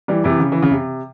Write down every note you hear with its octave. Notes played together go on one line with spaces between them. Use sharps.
E3 G3
C3 E3
C#3
E3
C#3
C3